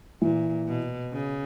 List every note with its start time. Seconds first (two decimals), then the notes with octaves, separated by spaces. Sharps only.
0.22 A#2 E3
0.68 B2
1.13 C#3